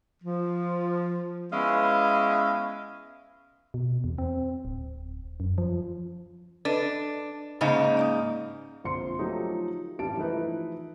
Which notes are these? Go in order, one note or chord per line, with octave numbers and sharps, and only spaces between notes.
F3
G#3 B3 C#4 E4 D#5 F5
B2
E2
C4
D1
F#2
F3
D4 A4 B4 D#5
G#2 C#3 A#3 C#4 D#4 F5
D5 A#5 D#6
A#1 D3 F3 C4 C6 C#7
F3 F#3 A3 D#4 F4 G4
A1 G2 G3 A5 D7
E3 F3 A3 D#4 E4 B4